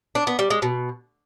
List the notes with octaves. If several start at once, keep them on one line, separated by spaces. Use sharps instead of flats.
D4
B3
G3
G#3
B2